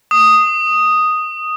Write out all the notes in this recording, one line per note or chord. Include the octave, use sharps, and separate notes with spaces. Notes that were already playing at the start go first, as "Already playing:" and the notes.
D#6